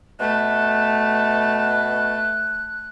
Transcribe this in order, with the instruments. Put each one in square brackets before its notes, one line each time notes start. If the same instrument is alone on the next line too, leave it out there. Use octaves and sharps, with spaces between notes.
[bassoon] B2 [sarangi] A3 [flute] F#6